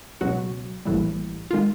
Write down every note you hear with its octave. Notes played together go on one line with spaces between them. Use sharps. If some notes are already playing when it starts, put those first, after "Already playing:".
C#2 B2 F#3 F#4
A#1 A2 E3 G3
D#3 G#3 F4